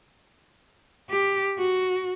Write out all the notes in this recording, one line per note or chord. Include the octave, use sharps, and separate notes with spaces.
G4
F#4